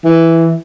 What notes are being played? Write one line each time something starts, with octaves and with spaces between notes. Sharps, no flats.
E3